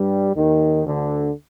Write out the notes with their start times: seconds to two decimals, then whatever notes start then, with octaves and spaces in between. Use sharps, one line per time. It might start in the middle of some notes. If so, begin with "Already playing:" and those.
Already playing: G2 G3
0.35 D#2 D#3
0.85 D2 D3